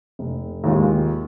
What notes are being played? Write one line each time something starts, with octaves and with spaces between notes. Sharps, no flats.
F1
D#2 D#3 G#3 F4